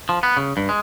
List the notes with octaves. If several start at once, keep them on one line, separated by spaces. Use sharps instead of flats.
F3
B3
C#3
G2
G#3